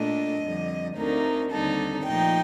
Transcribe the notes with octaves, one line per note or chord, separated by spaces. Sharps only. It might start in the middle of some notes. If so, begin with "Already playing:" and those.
Already playing: A#2 A3 D4 D#5
F2 D3 G3
D2 D3 A3 C4 D#4 A#4
D#2 D3 G3 C4 D#4 A4
A#2 F3 A3 D#4 G5